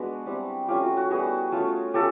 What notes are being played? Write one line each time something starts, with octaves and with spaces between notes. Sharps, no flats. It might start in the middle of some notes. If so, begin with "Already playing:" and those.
Already playing: G#3 B3 D4 F#4 B4
G3 C4 E4
A3 C#4 E4 F4 G4
F#4
F#4
G3 B3 E4 F#4 G#4
A3 C#4 F4
A3 C#4 F4 G4 A4